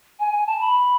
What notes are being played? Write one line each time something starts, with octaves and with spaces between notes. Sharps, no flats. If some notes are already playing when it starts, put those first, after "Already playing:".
G#5
G#5
A5
B5